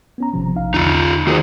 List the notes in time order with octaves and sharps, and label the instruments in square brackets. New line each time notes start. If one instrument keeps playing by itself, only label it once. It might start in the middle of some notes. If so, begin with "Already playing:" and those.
[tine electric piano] B3 C#4 A#5
G#1 C3 F3
A#1 D#4 F5
[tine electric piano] E2 D3 [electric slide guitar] D#4 F4
[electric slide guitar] D#3 F4 G#4 [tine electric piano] F#4 A#4 C5